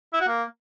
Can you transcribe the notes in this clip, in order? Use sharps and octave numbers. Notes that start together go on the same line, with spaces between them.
E4
F#4
A#3